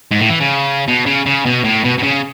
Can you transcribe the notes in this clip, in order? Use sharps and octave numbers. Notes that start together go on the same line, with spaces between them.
G#2
A2
E3
C#3
B2
C#3
C#3
B2
A2
B2
B2
C#3